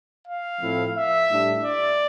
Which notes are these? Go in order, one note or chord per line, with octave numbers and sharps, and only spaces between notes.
F5
A2 F3 A3 C4 E4
E5
A2 G3 D4
D5